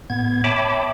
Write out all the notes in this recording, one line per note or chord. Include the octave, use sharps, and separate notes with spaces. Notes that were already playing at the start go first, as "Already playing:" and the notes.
A2 B3 G#6
C#5 E5 G5 A5 B5 D6